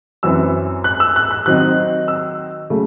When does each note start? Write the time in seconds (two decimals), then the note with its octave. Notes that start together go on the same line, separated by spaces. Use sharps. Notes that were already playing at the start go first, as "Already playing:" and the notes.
0.23 F#2 E3 C4 E6
0.84 F#6
1.00 E6
1.16 F#6
1.31 F#6
1.46 D#3 F#3 C4 D#4 F#6
2.08 E6
2.70 C#3 F#3 A3